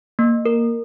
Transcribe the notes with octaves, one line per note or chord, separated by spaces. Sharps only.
A#3
A#4